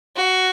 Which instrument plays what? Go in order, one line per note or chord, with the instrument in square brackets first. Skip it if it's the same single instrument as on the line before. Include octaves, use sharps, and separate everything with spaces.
[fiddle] F#4